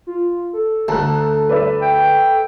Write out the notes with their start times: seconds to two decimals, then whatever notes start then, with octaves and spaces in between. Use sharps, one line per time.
0.07 F4
0.53 A4
0.88 D2 A4 A5 A#5 F#6
1.49 B4 D5 E5
1.82 G5